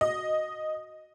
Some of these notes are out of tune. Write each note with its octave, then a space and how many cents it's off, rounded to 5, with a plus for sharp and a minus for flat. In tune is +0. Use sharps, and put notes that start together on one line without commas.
F#4 -10 D#5 +0